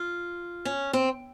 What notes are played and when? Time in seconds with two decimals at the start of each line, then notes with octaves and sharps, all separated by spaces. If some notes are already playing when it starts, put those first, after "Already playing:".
Already playing: F4
0.65 C#4
0.93 C4